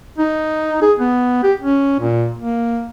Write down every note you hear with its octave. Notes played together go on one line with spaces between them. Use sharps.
D#4
G#4
B3
G4
C#4
A#2
A#3